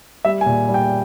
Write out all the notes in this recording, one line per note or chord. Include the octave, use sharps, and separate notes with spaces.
G3 E5
G#5
A#2
G3
G5